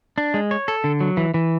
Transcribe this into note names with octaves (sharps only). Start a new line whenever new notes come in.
D4
G#3
C#5
A4
D3
F#3
E3
E3